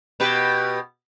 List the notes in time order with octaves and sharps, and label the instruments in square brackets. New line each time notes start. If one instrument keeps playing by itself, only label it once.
[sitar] B2 G4 B4